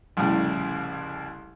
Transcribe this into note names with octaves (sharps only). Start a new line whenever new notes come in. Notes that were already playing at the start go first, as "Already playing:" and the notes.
C2 F2 A2 C#3 G3